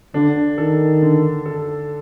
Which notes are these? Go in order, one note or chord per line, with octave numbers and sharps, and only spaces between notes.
D3 D4
D#3 A4
D3
A4